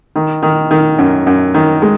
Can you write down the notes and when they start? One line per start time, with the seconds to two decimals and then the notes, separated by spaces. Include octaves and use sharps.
0.16 D#3
0.43 D#3
0.71 D#3
0.98 F#2
1.27 F#2
1.54 D#3
1.82 G#3